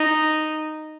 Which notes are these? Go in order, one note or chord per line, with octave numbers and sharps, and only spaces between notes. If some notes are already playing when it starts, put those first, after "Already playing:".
Already playing: D#4